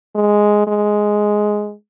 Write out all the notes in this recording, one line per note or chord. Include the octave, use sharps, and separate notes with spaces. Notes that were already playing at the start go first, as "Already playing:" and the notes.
G#3
G#3